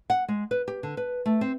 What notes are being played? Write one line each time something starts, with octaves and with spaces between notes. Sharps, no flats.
F#5
G#3
B4
G4
D3
B4
A3
C4